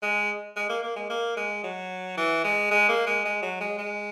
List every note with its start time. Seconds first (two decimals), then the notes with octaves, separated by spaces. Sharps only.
0.02 G#3
0.56 G#3
0.69 A#3
0.83 A#3
0.96 G#3
1.10 A#3
1.37 G#3
1.64 F#3
2.17 E3
2.44 G#3
2.71 G#3
2.89 A#3
3.07 G#3
3.25 G#3
3.42 F#3
3.60 G#3
3.78 G#3